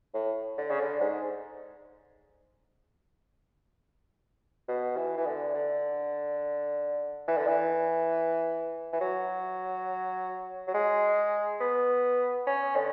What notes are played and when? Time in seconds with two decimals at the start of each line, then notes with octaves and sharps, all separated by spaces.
0.14 A2
0.58 D3
0.70 C#3
0.80 D3
1.01 G#2
4.68 B2
4.97 E3
5.17 E3
5.26 D3
5.54 D3
7.28 E3
7.37 D3
7.47 E3
8.93 E3
9.00 F#3
10.68 F#3
10.74 G#3
11.60 B3
12.47 C#4
12.76 D3